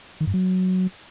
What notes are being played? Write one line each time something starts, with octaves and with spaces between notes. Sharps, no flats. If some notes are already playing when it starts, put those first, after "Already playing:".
D#3
G2
F#3